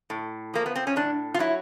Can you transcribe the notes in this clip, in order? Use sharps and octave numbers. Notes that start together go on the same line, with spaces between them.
A2
F3 A#3
B3
C4
C#4
A2 D4
F4
F#3 E4